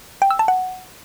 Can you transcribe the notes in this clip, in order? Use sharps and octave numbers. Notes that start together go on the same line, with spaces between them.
G5
E6
A5
F#5